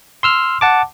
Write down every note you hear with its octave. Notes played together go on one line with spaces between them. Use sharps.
C6 E6 F6
F#5 A5 D6